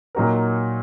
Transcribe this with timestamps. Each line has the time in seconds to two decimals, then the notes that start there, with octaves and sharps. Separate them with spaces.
0.15 A#2 F#3 D#4 F#4 A#4